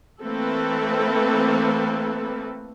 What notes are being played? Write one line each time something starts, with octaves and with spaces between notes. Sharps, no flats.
E3 A3 A#3 C4 A4 B4